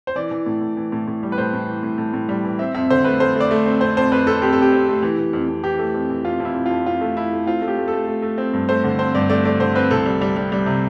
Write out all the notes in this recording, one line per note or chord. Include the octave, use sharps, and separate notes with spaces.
C5
E3 D5
E3
A2
A2
E3
A2
A2
G3
B4
A2 C5
A2
E3
A2
A2
A2
G3
E3
C4 E5
F2 E5
D3 C5
A3 B4
A3 C5
A3
D5
A3
C4
F2 C5
F2 C5
F2 B4
F2 A4
F2 G4
A4
F2 G4
C4
A3
E3
E3
F2
F2
E3 G4
A3
F2
E3
F2 F4
F2 E4
F2
F2 F4
F2 F4
A3
A3 E4
A3
C4 F4
A3
G4
A3
A4
A3
A3
A3
C4
G2
A3 C5
D3
C4 C5
G2 D5
A3 D5
A3 D5
D3 C5
C4 B4
C2 A4
G3
G3
G3
G3
C3